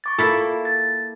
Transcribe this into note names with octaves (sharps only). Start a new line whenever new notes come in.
C#6 D6 A6
A#3 E4 F4 A4
A6